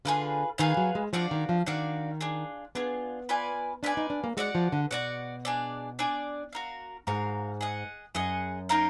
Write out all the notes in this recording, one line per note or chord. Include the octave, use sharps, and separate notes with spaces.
D3 F4 G#4 B4 F5
D#3 F4 G#4 B4 F5
F#3
G#3
F3 D4 F#4 D5 F5
D#3
F3
D#3 D4 F#4 D5 F5
D4 F4 G#4
B3 D4 F4 G#4
F4 B4 D5 G#5
D4 F4 B4 D5 G#5
D#4
D4
A#3
G#3 F#4 D5 F#5
F3
D3
B2 F#4 D5 F#5
D4 G#4 D5
D4 G#4 D5
F#4 A#4 F5
G#2 F#4 A#4 F5
G#4 D#5 F#5
F#2 G#4 D#5 F#5
A#3 D#4 A#4 F5